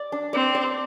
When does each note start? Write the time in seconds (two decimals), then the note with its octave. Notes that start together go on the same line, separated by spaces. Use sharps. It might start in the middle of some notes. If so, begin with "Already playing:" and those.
Already playing: D5
0.12 D4
0.33 C4 D5
0.55 D5